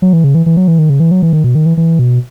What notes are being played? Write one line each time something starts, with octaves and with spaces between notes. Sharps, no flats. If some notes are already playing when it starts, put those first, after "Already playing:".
F#3
E3
C#3
E3
E3
F#3
E3
D#3
C#3
E3
F#3
E3
D#3
B2
D#3
E3
E3
B2